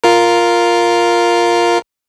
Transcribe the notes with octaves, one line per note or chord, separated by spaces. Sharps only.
F4 A#4